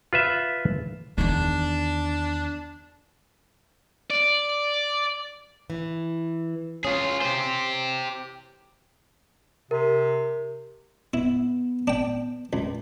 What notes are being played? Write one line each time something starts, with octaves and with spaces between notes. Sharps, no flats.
F4 B4 E5
E2 D#3 D4
D5
E3
C#4 F4 G#4
G4 C5
C3 A#4
B3 E4
D4 G5
C#2